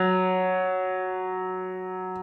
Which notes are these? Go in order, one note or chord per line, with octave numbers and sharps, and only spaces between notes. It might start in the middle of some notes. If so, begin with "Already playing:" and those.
Already playing: F#3